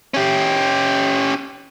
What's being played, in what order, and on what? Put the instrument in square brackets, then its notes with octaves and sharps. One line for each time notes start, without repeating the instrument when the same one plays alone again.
[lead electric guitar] C#4 G4